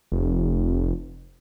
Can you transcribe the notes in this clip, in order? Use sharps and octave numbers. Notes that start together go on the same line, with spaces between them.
F1